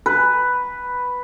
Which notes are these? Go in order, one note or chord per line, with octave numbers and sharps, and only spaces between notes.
B4